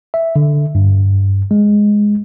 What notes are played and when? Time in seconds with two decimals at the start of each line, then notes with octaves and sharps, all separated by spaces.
0.14 E5
0.36 D3
0.75 G2
1.51 G#3